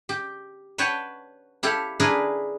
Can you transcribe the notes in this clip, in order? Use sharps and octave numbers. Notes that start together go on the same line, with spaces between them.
G4
B4 C#5 F#5 G5 A5
E4 G4 A4 F5
D4 E4 G#4 A#4 B4 G#5